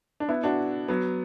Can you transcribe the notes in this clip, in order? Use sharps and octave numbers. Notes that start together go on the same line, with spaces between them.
D4
B3 E4
D4 F#4
F#3 B3